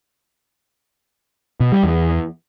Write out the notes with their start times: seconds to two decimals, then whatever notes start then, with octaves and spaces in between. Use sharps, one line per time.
1.60 B2
1.72 G3
1.83 E2